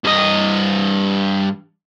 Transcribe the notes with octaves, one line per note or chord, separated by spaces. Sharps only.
G2 D#5